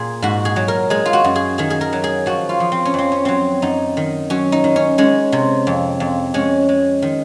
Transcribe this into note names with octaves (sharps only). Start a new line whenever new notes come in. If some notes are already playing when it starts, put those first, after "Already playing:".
Already playing: A#2 G#4
G#2 F#4
G#4
F#3
A#4
G#3 G#4
F4
F#4
F#2
G#4
D#3 G#4
G#4
A#4
F#3
G#4
F3 F#4
F4
F3
C4
C#4
F2 C4
C#4
F#3 C4
F#2 D#4
D#3
F#3 C#4
D#4
D#3
C#4
G#3 C#4
C3
F2
F2
G#3 C#4
G#3
D#3